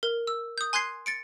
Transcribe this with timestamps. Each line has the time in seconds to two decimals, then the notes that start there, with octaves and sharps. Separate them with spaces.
0.03 A#4
0.27 E6
0.58 D#6 G6
0.73 G#5 C6 F#6 G#6 C7
1.06 A6 C#7 D7